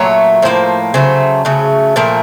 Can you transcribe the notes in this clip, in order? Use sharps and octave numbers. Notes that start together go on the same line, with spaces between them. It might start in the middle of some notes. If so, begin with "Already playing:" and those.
Already playing: A#2 F#3 A3 C#5
A2 F3 A#3 C5
C#3 F#3 A3 C5
C#3 F#3 A3
A#2 F3 A3 A#4